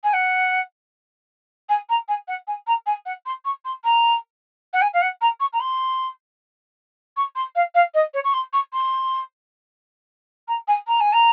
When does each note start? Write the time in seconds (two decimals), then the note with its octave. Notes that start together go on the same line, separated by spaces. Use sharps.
0.04 G#5
0.13 F#5
1.69 G#5
1.89 A#5
2.08 G#5
2.28 F#5
2.47 G#5
2.67 A#5
2.86 G#5
3.06 F#5
3.26 C6
3.45 C#6
3.65 C6
3.84 A#5
4.73 F#5
4.82 G#5
4.94 F5
5.02 F#5
5.21 A#5
5.40 C#6
5.53 A#5
5.60 C6
7.17 C#6
7.35 C6
7.55 F5
7.75 F5
7.94 D#5
8.14 C#5
8.24 C#6
8.34 C6
8.53 C#6
8.73 C6
10.48 A#5
10.68 G#5
10.87 A#5
11.00 G#5
11.13 A#5